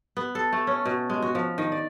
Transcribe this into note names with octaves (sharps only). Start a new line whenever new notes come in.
B3
A4
A3
C#4
B2
G#3
F#4
F3
D#3
D5